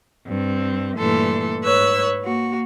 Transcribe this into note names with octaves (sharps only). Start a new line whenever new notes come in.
G2 C4
G2 A#2 E3 A3 A4 C6
G#2 B4 C#5 E6 F#6
A#3 F#4